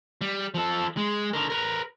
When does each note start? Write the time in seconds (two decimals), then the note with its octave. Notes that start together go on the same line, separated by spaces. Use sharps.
0.21 G3
0.54 F3 A4
0.97 G#3
1.33 D3 A#4
1.50 A#4 B4